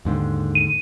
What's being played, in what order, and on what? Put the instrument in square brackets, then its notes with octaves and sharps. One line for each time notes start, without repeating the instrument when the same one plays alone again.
[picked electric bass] D#2 G#2 D3
[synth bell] D#7